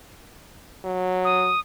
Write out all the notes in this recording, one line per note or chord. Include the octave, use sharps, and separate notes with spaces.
F#3
D#6